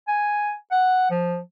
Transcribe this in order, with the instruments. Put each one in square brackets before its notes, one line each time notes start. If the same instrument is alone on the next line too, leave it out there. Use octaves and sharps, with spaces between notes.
[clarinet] G#5
F#5
F3